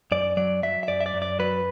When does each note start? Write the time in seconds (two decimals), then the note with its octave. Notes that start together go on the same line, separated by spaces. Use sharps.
0.12 F#2 D5
0.37 F#3 D5
0.63 F#3 E5
0.83 E5
0.88 F#2 D5
1.01 E5
1.06 D5
1.14 F#2
1.22 D5
1.39 F#3 B4